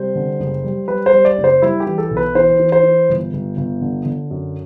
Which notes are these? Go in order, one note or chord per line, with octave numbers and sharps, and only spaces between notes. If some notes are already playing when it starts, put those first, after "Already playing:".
Already playing: C3 G3 C5
D3
F#1
G3
G3 B4
C5
G3
D5
F#1
C5
G3 E4
G4
E3
A4
B1
B4
E3 C5
E3
C5
E3
G1
G1
G1
D3
D3
F#2